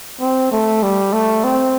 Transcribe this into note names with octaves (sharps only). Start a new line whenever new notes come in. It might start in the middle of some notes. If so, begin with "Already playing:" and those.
C4
A3
G3
A3
C4